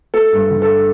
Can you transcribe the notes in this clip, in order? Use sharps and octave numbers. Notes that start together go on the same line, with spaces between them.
A3 A4
G2
D3
A4